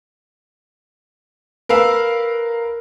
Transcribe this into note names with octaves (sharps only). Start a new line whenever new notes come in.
A#4 B4 F5 E6